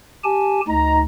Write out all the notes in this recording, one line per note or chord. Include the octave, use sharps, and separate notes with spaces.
G4 G#5 A5
D2 D#4 A#5